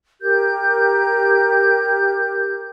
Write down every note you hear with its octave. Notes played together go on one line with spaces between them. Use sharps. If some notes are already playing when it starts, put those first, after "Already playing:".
G4 A#4 G6